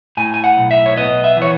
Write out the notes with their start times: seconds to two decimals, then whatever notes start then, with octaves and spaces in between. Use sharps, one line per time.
0.17 A2 G#5
0.34 G#5
0.44 F#5
0.57 B1
0.71 E5
0.86 C#5
0.97 B3 D#5
1.24 E5
1.37 E3 C#5